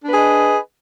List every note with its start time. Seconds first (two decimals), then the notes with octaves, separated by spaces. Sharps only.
0.02 D4
0.06 B4
0.10 G#4
0.14 D#5